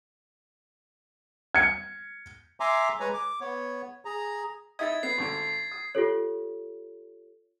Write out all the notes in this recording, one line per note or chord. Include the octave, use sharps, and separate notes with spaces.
G#6 C#7
E5 G#5 A#5 C6 D6
G#3 B4 C#5 G#5 A#5
D6
B3 C#5
G#4 A#5
D#4 E4 D#5 G#6 A6
B3 C7
G#1 D3
D#6
F4 G4 A4 C#5